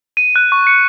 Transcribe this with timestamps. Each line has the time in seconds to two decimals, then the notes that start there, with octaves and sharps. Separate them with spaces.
0.17 D#7
0.36 F#6
0.52 C#6
0.67 C#7